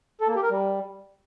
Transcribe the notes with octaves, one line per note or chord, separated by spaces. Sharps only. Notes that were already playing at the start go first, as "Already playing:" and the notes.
A4
A#3
G4
A#4
G3